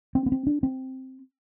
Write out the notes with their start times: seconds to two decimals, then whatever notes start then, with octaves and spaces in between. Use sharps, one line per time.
0.15 C4
0.26 B3
0.32 C4
0.47 D4
0.63 C4